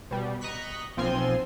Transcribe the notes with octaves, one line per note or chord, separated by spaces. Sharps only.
B2 G3
D#5 A#5 C#6 F#6 B6
B1 F3 C4 F4 G#5 C6